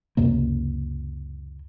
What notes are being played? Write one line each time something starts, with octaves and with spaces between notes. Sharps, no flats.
C#2 F#2 C3 A#3